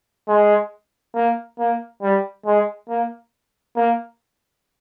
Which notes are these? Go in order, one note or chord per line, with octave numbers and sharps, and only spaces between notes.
G#3
A#3
A#3
G3
G#3
A#3
A#3